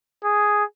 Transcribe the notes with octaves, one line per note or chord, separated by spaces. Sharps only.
G#4